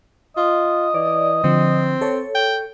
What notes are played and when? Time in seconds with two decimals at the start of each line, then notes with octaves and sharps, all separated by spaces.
0.37 F4 D#5
0.94 E3 D5
1.44 D3 F3 C4
2.01 A4 C#5
2.35 G5